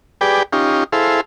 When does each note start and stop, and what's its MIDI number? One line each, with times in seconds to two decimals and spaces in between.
0.21 0.43 67
0.21 0.43 68
0.21 0.43 71
0.21 0.43 74
0.21 0.43 79
0.53 0.84 61
0.53 0.84 63
0.53 0.84 65
0.53 0.84 67
0.92 1.21 64
0.92 1.21 68
0.92 1.21 69
0.92 1.21 72
0.92 1.21 77